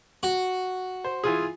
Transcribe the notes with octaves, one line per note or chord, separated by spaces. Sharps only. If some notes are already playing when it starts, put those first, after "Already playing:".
F#4
C5
E3 F4 G#4